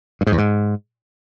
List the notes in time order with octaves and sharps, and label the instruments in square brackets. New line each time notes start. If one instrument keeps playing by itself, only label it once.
[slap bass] G2
G#2
E2
G#2